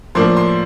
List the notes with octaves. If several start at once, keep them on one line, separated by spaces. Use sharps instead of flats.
A2 F3 A#3 D4 C6
C6